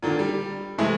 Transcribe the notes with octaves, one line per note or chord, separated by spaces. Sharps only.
A#2 D3 D#3
G3
C3 E3 G#3 A3